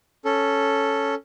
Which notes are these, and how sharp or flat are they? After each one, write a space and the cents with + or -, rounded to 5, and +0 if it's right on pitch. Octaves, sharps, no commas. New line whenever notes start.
C#4 +0 A4 +0